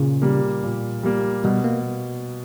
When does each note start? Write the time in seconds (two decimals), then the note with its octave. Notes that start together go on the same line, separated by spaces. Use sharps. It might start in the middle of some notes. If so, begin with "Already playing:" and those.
Already playing: A#2 C#3
0.22 G3 A#3
0.63 A#2
1.03 G3 A#3
1.44 B2 G3
1.64 A#3